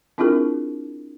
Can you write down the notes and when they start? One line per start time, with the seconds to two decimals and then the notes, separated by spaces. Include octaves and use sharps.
0.18 C4 D4 E4 F4 G#4 A#4